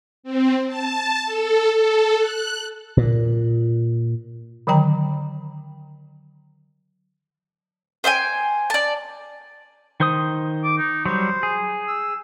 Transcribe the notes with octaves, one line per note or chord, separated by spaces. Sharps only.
C4
A5
A4
A4
F#6
A#2
D3 D#3 F#3 G5 A#5
C5 E5 G5 G#5
D5 A5
D#3 C5 D#6
D6
D#4
F#3 G3 C5
G#4
E6